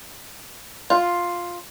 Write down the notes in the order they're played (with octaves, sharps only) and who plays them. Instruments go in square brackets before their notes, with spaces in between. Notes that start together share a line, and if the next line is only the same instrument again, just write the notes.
[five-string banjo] F4